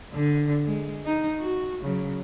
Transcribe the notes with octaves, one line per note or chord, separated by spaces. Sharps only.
D3
G#3
D#4
F#4
C#3 F#3